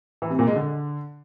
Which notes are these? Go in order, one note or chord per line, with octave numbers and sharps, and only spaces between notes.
E3
C3
A#2
G#3
D3